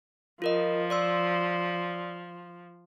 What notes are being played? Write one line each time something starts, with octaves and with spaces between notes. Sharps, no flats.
F3 F4 A#4 D#5
D5 C6 E6